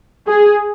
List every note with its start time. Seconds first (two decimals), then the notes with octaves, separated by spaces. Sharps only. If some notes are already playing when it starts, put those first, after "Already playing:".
0.27 G#4